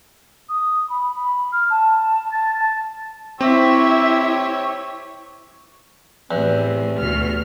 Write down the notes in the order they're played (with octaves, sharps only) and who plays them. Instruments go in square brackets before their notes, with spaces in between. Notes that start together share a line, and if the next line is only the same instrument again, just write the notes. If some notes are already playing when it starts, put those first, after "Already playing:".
[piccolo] D#6
B5
B5
F6
A5
A6
A5
[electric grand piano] C4 [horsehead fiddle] E4 E5 [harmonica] G4 C#5 C#6
[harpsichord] E2 [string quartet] A2 C3
[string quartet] D2 B2 F6